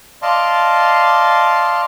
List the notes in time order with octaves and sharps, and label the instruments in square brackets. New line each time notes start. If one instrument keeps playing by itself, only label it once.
[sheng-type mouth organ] D5 D#5 F5 A5 C6